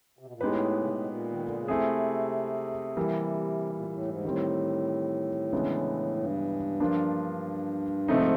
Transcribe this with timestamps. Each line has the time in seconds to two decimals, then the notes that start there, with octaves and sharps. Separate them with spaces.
0.19 C3
0.26 B2
0.34 A#2
0.41 A2 G#3 B3 D#4 G4 B4
0.81 C#3
0.88 C3
0.97 B2
1.05 A#2
1.30 D#3
1.43 D3
1.56 C#3
1.68 C3 A3 C4 E4 G#4
2.97 E3 G3 A#3
3.76 A#2
3.88 A#2
3.93 A2
4.08 G#2
4.24 A2 D#3 G3 C4
5.53 C#3 E3 G#3 B3 D4
6.16 G2
6.80 F3 A#3 D4 F4
8.08 G#2 C3 F3 A3 C4 D#4